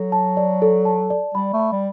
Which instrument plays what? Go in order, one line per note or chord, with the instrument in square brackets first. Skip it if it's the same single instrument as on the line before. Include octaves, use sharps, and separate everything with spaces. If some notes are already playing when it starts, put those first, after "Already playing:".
Already playing: [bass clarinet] F#3 [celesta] A4
[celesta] A5
D5
A4
A5
D5
[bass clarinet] G3 [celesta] B5
[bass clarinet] A3
[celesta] B5
[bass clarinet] G3